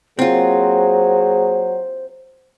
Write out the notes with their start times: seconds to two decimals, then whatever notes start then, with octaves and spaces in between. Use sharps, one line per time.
0.19 F#3 A#3 C4 F4 G#4 C5